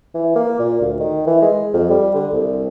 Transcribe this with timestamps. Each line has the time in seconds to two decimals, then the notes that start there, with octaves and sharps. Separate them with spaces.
0.15 E3
0.36 A#3
0.59 A#2
0.81 D2
0.99 D#3
1.26 E3
1.42 G#3
1.73 F2
1.90 G3
2.14 D3
2.33 C2